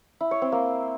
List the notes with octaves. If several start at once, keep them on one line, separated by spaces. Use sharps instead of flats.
E4
C#5
C4
A#3